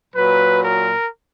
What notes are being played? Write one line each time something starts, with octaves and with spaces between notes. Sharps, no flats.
A#2 F#3 B4
A#4